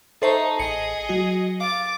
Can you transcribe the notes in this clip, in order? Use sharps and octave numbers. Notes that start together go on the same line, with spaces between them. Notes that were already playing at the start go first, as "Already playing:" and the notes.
D#4 A4 C5 D#5 E5 A5 C#6
A1 G#4 D#5 C#7
F#3 F#4
F5 D6 A6